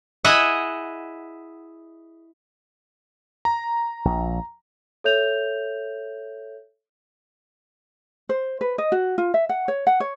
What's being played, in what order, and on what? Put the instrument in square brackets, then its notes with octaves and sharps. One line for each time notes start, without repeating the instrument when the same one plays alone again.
[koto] E4 G#4 D#5 E5 F#5
[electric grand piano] A#5
[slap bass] A#1
[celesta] A4 C#5 E5 G6 F7
[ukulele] C5
B4
D#5
F#4
F4
E5
F#5
C#5
F#5
C#5